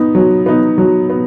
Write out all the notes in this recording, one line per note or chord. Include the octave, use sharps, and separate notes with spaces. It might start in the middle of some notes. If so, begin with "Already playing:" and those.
Already playing: B3 D#4
F#3
B3 D#4
F#3
B3